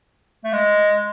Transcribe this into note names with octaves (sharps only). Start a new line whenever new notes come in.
A3
G#3